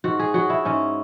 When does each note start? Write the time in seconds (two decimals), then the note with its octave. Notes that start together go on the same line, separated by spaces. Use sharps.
0.04 G#2 F#4
0.19 G#4
0.34 F#3 F#4
0.50 E4
0.65 G#2 C#4